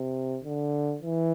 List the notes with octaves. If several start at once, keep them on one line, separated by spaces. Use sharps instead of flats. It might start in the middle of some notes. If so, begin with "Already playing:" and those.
Already playing: C3
D3
E3